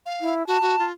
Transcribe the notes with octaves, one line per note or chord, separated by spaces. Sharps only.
F5
E4
F#4 A5
F#4
F4